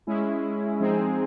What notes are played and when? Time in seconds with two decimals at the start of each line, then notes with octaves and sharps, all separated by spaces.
0.07 G#3 C#4 E4 G#4
0.80 F3 G#3 C4 D#4 G#4